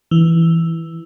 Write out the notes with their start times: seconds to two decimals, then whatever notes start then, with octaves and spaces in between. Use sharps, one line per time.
0.11 E3